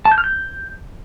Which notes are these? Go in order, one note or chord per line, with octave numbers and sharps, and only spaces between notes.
A5
G6
F6
G6